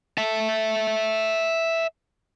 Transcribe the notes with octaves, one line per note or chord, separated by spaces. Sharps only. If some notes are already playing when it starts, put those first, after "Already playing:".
E5 A5